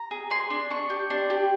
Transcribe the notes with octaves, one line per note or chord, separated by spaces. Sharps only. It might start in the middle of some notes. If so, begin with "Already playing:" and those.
Already playing: A#5
G#4
G#4 C6
D4
D4 C#6
G4
D4 C6
G4